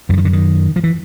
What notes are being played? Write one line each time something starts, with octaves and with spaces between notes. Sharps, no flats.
F#2 D3 E3
D#3
D3
D#3
F3
E3